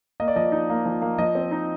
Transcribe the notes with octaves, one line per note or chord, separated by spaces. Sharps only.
A#3 D#5
D5
F3 D#5
D#4
A#3
F3
A#3
F3 D#5
C4
D#4